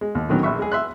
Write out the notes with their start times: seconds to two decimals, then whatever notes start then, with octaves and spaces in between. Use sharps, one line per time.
0.01 G#3
0.15 D#2
0.29 D3 D#3 F#3 B3 C#4
0.43 A#1 E5 C#6
0.59 G#3 G#4
0.72 E5 C6 F#6